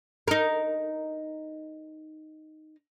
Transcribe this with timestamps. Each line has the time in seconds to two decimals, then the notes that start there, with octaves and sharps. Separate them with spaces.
0.28 D#4 A#4